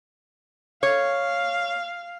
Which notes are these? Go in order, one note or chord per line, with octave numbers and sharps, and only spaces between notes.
C#5 F5